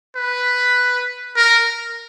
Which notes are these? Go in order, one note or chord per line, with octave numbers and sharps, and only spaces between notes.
B4
A#4